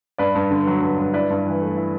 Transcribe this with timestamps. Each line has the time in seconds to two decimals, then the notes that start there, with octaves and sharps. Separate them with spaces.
0.18 G2 B4 D5
0.35 G2
0.51 D3
0.67 F#3
0.82 G2
0.99 G2
1.13 E4 B4 D5
1.30 G2
1.46 E3
1.62 A3
1.77 E4